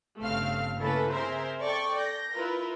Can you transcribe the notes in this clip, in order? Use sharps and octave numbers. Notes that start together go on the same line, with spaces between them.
G1 C#3 A3 C4 F5 F6
C#3 A#3 C#4 E4 A4 B4
C4 G#4 A#4 C5 E5
A4 D5 G5 C#6
G6 A#6
E4 F4 A#4 B4